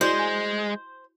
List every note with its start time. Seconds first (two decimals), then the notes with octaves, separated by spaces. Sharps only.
0.01 G#3 E4 F#4 C5 D5
0.19 G#5